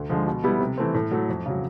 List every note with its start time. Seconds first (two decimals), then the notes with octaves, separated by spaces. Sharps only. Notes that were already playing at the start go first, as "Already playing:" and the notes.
Already playing: D2
0.09 D3 F3 G#3
0.27 B2
0.44 G3 B3 E4 G4
0.61 C3
0.78 E3 A3 C4
0.94 A2
1.11 F#3 A3
1.29 F2
1.46 C#3 F#3